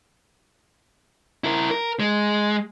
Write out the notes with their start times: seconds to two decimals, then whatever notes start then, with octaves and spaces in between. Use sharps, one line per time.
1.44 E4 A#4
1.71 A#4
1.99 G#3